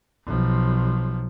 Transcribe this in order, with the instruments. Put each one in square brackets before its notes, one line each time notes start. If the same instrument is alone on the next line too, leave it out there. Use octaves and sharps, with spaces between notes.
[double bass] B1 F3